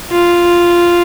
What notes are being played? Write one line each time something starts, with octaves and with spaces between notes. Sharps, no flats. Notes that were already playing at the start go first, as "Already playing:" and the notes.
F4